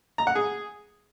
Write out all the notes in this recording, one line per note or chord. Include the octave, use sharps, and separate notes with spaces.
A#5
F#5
G#4